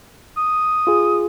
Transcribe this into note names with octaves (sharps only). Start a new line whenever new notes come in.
D#6
F4 G#4